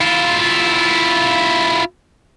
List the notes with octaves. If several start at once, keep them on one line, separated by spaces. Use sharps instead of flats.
E4 F4